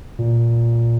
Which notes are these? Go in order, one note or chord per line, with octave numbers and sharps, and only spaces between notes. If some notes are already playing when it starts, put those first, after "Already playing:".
A#2